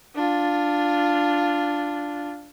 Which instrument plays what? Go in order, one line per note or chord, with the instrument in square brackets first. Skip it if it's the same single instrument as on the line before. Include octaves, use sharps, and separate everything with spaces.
[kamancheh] D4 F4